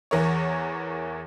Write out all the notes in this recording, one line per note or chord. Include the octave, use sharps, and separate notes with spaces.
E2 E3 A#4 C#5